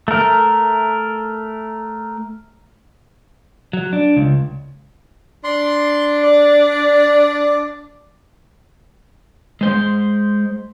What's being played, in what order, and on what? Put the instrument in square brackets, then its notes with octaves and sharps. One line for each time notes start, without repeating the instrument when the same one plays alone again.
[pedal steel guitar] A3 A#4
[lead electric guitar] F#3
D4
C#2
[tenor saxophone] D4 [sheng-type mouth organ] C6
[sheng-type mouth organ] D5
[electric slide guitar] G#3 C5